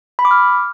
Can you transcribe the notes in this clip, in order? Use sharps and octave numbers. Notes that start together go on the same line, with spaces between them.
B5
D6
F6